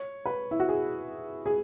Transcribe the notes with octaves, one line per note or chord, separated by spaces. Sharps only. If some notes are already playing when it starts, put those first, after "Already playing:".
Already playing: C#5
B4
E4
F#4
G#4
G#4